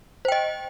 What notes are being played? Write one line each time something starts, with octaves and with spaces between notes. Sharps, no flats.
C5 D#5 G5